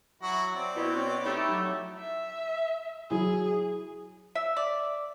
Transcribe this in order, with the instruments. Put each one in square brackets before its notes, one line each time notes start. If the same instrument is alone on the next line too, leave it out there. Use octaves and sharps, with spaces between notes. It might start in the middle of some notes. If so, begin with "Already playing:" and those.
[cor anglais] F#3 [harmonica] E4 F#4
[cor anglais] C4 [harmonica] D5
[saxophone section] B2 [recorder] E4
[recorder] C4 [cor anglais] C#5
[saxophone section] A3 G4 [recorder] D#4 [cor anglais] E4
[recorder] F#3
[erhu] E5
[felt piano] F#3 E4 [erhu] G#4
[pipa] E5
D5